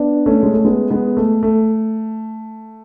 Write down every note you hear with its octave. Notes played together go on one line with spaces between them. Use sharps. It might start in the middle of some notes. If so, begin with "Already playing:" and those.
Already playing: B3 D4
A3 C#4
G#3
A3
G#3 B3
G#3 B3
A3
A3